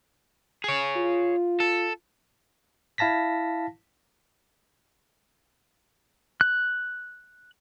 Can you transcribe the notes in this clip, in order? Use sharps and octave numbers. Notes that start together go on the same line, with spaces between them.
G#4 C#5
F4
A4
E4 F5 A5 A#6 B6
F#6